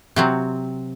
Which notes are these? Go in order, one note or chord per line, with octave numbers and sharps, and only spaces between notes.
C3 F#3 C4